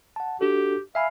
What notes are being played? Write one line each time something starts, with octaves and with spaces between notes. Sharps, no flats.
F#5 A5
D4 F#4 G4 A4
E5 F5 G#5 B5